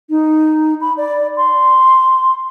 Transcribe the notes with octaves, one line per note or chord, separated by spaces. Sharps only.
D#4
B5
D5
C6